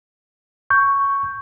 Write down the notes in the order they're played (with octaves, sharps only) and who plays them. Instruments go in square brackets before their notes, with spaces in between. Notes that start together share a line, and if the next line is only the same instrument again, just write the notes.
[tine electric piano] C#6 G6